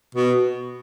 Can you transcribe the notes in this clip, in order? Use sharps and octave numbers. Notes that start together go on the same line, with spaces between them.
B2